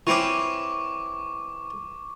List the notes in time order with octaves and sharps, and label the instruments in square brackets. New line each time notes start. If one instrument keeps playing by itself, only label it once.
[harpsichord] E3 C4 C#4 [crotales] C#6 D6